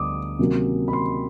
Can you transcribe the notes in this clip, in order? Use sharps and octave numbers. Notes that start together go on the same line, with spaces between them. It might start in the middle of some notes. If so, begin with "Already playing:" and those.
Already playing: D2 D3 G3 B3 D6 D#6
C3 D#3 F#3 A#3 C#4
B5
C6